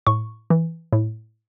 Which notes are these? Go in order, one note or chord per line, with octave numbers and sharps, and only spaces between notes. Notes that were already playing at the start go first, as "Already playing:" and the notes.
A2 C#6
E3
A2